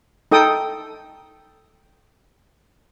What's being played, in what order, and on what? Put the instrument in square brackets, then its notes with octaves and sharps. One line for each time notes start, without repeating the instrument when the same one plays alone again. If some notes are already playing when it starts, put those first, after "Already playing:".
[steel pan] D#4 A4 G5 D#6